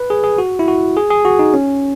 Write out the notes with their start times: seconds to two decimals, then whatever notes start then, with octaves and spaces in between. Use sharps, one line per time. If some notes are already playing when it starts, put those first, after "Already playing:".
Already playing: B4
0.10 G#4
0.24 G#4
0.38 F#4
0.59 E4
0.68 F#4
0.97 G#4
1.11 G#4
1.25 F#4
1.39 D#4
1.54 C#4